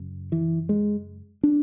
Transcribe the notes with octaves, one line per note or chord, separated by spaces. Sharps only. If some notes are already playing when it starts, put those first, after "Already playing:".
Already playing: F#2 C#3
E3
G#3
D4